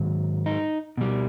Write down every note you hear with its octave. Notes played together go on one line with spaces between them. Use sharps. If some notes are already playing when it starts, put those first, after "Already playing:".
Already playing: G#2 D#3 F#3
D#4
B2 G3